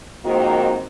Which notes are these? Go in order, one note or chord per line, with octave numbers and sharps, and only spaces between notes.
F2 G#2 D#3 A#3 C4 F#4